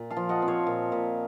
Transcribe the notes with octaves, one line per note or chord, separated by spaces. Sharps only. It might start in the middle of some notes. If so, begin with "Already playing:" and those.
Already playing: A#2
F5 A5
F3
D#5 F#5
C4
C#5 F5
A#2
A#2